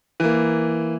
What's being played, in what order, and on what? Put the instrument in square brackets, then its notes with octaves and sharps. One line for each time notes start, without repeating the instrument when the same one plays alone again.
[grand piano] E3 A#3